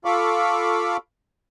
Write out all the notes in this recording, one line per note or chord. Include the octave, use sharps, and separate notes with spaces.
F4 A4 F5 B5 C#6 D6